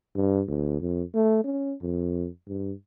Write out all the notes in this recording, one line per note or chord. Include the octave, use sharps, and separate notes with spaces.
G2
D2
F2
A3
C#4
F2
G2